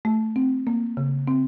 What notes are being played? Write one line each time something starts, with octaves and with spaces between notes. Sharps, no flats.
A3
C4
A#3
C#3
C4